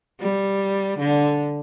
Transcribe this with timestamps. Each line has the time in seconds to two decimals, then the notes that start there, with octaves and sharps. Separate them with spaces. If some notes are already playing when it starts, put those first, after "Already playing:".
0.20 G3
0.99 D3